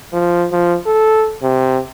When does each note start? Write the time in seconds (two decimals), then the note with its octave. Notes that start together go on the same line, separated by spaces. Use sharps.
0.13 F3
0.52 F3
0.86 A4
1.42 C3